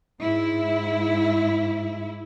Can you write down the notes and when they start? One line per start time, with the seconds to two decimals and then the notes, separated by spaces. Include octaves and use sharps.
0.22 G#2 E4